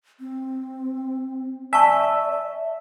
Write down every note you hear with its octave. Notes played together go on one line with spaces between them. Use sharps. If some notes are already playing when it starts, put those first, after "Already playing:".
C4
D5 E5 G#5 A5 C#6